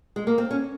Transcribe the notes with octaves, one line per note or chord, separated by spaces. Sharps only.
G#3
A#3
C4
C#4